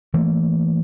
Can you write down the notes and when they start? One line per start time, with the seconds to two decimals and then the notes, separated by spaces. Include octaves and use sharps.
0.14 E3 A3 A#3